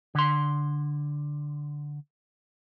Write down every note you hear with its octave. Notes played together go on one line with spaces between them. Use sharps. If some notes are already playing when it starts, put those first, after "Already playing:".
D3 C6